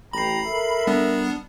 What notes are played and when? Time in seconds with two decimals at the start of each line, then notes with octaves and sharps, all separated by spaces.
0.13 A1 G5 A#5 B5 C7
0.47 A4 A#4 E5
0.87 G3 B3 D4